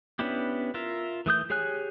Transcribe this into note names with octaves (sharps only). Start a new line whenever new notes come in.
B3 C#4 D4 E4 G4
F4 A#4 E5 F5
E3 A3 D#6 G6
G4 G#4 C#5 G#5 F#6